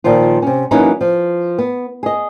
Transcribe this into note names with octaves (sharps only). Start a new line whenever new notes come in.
A#2 D#3 F3 F4
C3 C#4
E3 F#3 A#3 C#4 D#4 E4
F3
B3
G#4 D#5